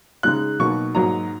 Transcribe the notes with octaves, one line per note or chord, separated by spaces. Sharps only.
C#3 G#3 D#4 F#6
B2 F#3 A#3 D#4 C#6
G#2 F#3 A#3 D#4 A#5